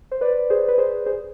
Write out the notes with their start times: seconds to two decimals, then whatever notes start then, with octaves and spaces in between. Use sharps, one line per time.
0.12 C5
0.21 B4 D5
0.50 G#4 C5
0.68 B4
0.78 G#4 C5
1.06 G#4 C5